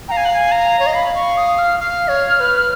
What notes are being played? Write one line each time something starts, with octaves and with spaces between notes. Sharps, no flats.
F5 G5 A#5
G#5
F#5
G#5
A#5
C#5
D#5
F5 B5
C#6
D#6
F6
F5 F6
C#5
C#5
B4